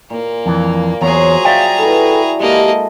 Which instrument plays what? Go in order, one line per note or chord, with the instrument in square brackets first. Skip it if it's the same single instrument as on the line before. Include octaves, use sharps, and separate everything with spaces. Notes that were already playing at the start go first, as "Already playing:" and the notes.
[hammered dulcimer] A#2 [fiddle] A#3
[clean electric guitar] F2 E3
[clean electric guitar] E2 [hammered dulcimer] F#3 C5 C6 [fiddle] G#4 A#5 [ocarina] C#5
[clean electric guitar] D5 E5 G5 [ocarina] F5
[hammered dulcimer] E4 F#4 B4 [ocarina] A4
[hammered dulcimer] G#3 A4 [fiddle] A#3 D#5 [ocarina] G4